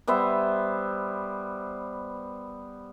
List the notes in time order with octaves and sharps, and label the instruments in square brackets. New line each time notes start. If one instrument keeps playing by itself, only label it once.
[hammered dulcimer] G3 B3 C5 E5